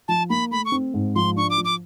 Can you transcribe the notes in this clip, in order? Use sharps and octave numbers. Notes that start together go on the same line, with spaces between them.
F3 A5
A#3 B5
A3 B5
C#6
C4
G#2
F3 C6
D4 C#6
D6
F3
D6